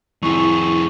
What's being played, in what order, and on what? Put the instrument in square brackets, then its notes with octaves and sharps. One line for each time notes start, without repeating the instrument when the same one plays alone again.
[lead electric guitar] F2 G#4 [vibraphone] E4 C#6